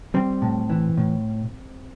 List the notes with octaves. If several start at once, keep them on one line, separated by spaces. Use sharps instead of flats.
G3 C4
A2
E3
A2